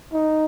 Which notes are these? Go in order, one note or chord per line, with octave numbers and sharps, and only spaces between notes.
D#4